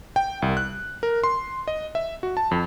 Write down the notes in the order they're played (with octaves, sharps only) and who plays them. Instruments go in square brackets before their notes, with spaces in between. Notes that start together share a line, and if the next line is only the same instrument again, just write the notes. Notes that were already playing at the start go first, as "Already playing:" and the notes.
[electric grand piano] G5
C2
F#6
A#4
C6
D#5
E5
F#4
A5
F2